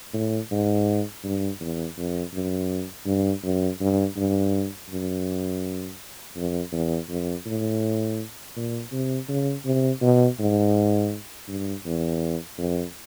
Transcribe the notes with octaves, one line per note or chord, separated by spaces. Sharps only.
A2
G#2
G2
E2
F2
F#2
G2
F#2
G2
G2
F#2
F2
E2
F2
A2
A#2
C3
C#3
C3
B2
G#2
G2
E2
F2